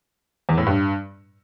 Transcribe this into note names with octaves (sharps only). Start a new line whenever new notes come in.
E2
A2
G2